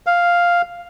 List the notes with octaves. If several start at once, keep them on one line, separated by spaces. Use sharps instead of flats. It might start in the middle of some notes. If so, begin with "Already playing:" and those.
F5